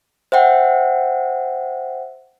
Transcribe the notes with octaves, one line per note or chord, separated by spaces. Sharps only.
C5 E5 F#5 G5